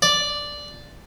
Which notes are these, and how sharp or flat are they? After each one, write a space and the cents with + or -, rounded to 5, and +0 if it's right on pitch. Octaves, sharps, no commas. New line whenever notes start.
D5 +0